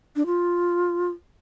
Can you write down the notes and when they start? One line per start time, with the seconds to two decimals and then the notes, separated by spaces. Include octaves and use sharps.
0.16 D4
0.26 F4